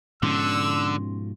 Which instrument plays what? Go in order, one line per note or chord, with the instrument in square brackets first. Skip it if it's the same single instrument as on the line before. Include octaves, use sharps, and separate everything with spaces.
[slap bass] G#2 B2 F3 [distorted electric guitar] D3 [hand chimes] C#4 C6 [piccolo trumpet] E6